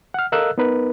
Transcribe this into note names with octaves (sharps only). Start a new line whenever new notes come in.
F#5 F6
A4 A#4 D#5 F5 E6 F#6
B3 D#4 A#4 B4